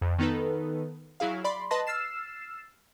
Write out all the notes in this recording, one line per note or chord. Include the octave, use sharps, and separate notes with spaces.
F2
D#3 B3 D#4 A4 B4
F#3 E4 G#4 F5
D5 B5 C6
B4 D#5 A5 C6 A#6
E6 F6 A6 C7 E7